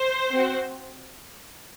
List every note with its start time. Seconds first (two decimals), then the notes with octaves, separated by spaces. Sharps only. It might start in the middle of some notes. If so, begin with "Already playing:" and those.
Already playing: C5
0.31 C4 F#4